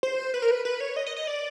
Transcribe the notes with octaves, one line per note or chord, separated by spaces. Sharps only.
C5
B4
A#4
B4
B4
C#5
D#5
D#5
D#5
D5